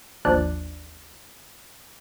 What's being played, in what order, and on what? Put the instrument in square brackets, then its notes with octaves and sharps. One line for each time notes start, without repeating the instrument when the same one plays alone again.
[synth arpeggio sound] G#1 D#2 F3 D4 D5 F#6